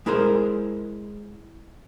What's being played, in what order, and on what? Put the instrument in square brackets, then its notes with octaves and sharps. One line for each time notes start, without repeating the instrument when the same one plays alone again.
[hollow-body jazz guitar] G#3 E4 G#4 A#4 C5